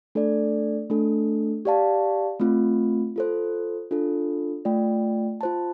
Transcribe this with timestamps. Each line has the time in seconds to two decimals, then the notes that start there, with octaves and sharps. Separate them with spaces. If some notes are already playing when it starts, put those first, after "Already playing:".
0.15 A3 D4 A4 D5
0.90 A3 D4 A4
1.65 G4 D5 F5 A5
2.40 A3 C4 F4
3.16 F4 A4 C5
3.91 D4 F4 A4
4.65 A3 F4 D5 G5
5.41 F4 C5 A5